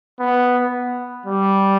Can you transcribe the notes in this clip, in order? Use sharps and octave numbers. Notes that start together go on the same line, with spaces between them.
B3
G3